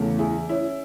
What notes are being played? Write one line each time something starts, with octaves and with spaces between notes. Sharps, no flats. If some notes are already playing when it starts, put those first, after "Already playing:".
Already playing: E2 C#3 E3 A3
E4 G#4
C#4 E4